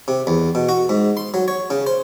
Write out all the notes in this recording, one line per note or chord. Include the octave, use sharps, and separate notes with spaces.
C3
E2
B2
F#4
G#2
C6
F#3
C#5
C#3
C5